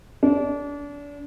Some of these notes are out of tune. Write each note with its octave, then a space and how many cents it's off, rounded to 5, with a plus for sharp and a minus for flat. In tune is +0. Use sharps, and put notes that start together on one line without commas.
D4 -30